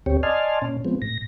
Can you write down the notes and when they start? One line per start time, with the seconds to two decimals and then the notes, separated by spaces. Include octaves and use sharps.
0.06 D2 C4 G4 C#5
0.23 D5 D#5 G#5 A5 C6 F6
0.62 A#2 C#4
0.85 F3 G#3 B3 C4
1.02 A2 A#6